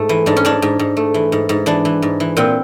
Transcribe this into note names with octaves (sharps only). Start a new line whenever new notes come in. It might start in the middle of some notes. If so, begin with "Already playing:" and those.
Already playing: G#2 A3
E3
G#2 D4
C#4
G#2 D4
G#2
G#2
A3
E3
G#2
G#2
E3 D4
E3
G#2
E3
A#2 C4